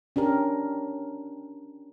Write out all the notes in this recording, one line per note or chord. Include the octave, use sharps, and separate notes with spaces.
C#4 D4 G4 A#4